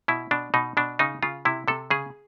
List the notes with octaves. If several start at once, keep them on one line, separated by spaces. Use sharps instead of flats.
B2 E4
B2 D4
B2 D#4
B2 D4
C#3 D#4
C#3 F4
C3 E4
C3 A4
C#3 G#4